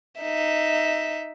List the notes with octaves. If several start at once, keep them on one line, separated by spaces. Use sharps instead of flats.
D#4 E5